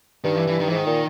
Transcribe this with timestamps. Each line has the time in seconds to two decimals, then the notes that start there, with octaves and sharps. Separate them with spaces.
0.24 G2 D#3
0.36 E3
0.47 E3
0.60 D#3
0.68 G#2 E3
0.76 D#3
0.86 A#2